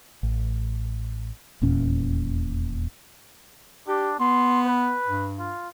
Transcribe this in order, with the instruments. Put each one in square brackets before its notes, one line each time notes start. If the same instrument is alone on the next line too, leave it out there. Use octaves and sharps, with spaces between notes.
[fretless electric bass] A1
D#1 E2 A#2 C#4
[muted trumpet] D4 [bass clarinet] G4
[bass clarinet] B3 [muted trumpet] C6
[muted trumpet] B4
[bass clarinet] G2
[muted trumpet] F4